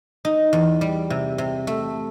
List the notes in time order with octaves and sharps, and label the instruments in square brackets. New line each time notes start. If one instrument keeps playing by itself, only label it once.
[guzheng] D#4
E2
G3
C3
C3
A3